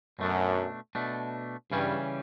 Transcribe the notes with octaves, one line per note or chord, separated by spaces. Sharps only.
F#2 B2 A3 D4
B2 A3 D4
G2 C#3 E3 G3 C#4